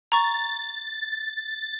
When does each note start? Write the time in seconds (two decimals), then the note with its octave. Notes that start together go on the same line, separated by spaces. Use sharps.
0.12 A#5 C#6 A6